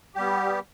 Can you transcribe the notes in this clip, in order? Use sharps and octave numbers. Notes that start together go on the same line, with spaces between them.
G3 B3 G4